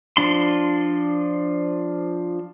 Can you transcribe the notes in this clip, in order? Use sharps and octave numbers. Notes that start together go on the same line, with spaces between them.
F3 D4 C6